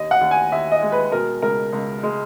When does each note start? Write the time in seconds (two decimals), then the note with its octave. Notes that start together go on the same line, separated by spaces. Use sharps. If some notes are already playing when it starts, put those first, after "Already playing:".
Already playing: D#2 D#5
0.11 F#5
0.21 D#2
0.31 G#5
0.52 D#2 E5
0.72 D#5
0.82 G#3
0.92 B4
1.12 B2 A#4
1.42 C#2 A#4
1.73 C#2
2.03 G#3